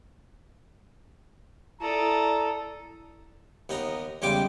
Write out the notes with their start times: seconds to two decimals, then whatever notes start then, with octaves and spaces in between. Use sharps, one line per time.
1.81 E4 A4 D5 A#5 D#6
3.69 D#2 B3 D#4 A#5
4.22 E2 C#3 G3 G#3 G5 D6